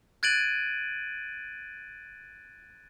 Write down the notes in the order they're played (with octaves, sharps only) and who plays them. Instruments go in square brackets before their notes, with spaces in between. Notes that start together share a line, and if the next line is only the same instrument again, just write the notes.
[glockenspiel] F#6 G#6 A6 D7 D#7 F#7